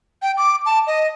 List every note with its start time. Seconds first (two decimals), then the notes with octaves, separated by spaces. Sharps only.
0.22 G5
0.37 D6
0.66 A5
0.87 D#5